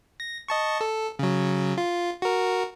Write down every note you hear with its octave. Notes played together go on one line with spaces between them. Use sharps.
A#6
D#5 A5 C#6
A4
C#3 F#3
F4
F#4 A#4